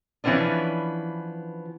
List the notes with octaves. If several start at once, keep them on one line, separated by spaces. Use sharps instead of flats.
E3 F3 B3 C#4 D4